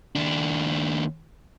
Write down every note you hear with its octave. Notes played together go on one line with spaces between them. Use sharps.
D#2 D4